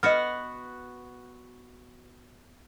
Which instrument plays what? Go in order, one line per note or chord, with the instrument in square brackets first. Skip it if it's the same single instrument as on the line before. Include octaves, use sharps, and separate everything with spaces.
[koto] B3 F#4 [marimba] D#5 F6